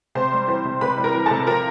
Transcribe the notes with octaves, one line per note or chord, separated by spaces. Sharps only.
C3 C5 C6
G3
E3 C5 C6
C3
C3 B4 B5
G3
A#4 A#5
E3
C3 A4 A5
F3 A#4 A#5